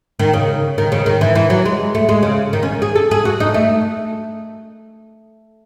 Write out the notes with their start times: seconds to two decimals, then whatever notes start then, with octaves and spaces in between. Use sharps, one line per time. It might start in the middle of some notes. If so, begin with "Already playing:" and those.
0.19 D#3
0.33 C#3
0.78 D#3
0.92 C#3
1.06 D#3
1.21 E3
1.35 E3
1.50 F#3
1.65 G#3
1.95 A3
2.09 G#3
2.23 C#3
2.53 D#3
2.63 C#4
2.82 G#4
2.96 A4
3.11 G#4
3.25 F#4
3.40 D#4
3.54 A3